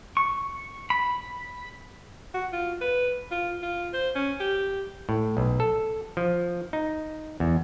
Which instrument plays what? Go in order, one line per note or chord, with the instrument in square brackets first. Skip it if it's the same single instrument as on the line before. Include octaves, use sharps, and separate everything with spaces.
[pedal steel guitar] C#6
B5
[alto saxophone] F#4
F4
B4
F4
F4
C5
C#4
G4
[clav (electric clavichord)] A2
B1
A4
F3
D#4
E2